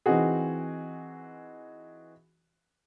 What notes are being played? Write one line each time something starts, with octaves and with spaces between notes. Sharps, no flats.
E3 C4 D#4 F#4 G#4